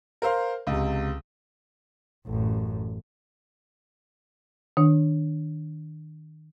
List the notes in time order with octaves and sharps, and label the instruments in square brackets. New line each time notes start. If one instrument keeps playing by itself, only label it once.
[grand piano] A#4 C5 F5 C6
C#2 C3
[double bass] A1 F#2
[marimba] D#3 D4